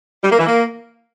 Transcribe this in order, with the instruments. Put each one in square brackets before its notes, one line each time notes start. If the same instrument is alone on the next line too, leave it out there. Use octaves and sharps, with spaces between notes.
[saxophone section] G3
A#3
E3
A#3